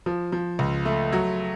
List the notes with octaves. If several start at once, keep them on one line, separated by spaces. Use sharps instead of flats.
F3
F3
C#2
A3
F#3